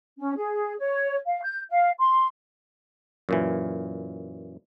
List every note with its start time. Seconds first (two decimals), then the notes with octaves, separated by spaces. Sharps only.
0.18 C#4
0.37 G#4
0.79 C#5
1.26 F5
1.42 G6
1.70 F5
1.99 C6
3.29 F#2 A#2 E3